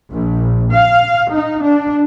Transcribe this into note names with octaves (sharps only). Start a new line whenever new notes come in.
A#1
F5
D#4
D4